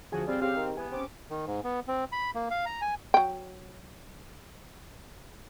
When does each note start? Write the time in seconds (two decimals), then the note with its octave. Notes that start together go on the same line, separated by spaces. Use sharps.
0.12 D2 F3 F#4 G#4 G#5
0.28 G3 C4 F4
0.41 C#3 G4 F5
0.56 D#3
0.77 E3 B3 G#5
0.92 C4 C#4 D6
1.30 D#3
1.46 G#2
1.64 B3
1.88 C4
2.12 B5
2.35 A#3
2.51 F5
2.66 A#5
2.81 G#5
3.14 F#3 G5